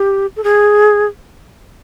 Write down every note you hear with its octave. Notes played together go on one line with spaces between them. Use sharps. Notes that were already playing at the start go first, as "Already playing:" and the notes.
Already playing: G4
A4
G#4